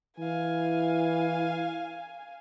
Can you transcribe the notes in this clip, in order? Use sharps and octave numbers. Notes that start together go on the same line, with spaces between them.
E3 F5 G#5